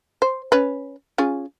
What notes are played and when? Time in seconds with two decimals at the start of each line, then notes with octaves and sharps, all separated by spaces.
0.22 C5
0.52 C#4 B4
1.18 C#4 F4 G#4